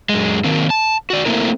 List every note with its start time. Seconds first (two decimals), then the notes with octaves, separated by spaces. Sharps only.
0.09 F#2 G#3
0.44 D#3 A#3 C4
0.70 A5
1.10 F#4 D5
1.25 A3 A#3 C4 E4 A#4